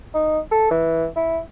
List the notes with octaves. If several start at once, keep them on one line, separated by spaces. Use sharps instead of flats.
D#4
A4
E3
E4